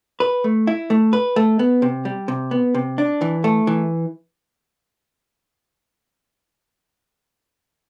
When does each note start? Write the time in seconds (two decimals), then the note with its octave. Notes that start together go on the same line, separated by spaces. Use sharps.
0.20 B4
0.44 A3
0.67 E4
0.90 A3
1.13 B4
1.36 A3
1.59 B3
1.82 C3
2.05 G3
2.28 C3
2.51 B3
2.75 C3
2.98 D4
3.21 E3
3.44 A3
3.67 E3